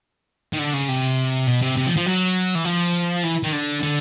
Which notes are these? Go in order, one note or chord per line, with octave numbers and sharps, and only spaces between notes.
D#3
D3
C#3
C3
B2
C3
C3
F3
F3
F#3
E3
F3
E3
D#3
D3
D3